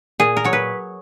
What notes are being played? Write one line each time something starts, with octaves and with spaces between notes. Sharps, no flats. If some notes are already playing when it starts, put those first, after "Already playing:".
A#2 G#4
A#4
F#3 C#5
B4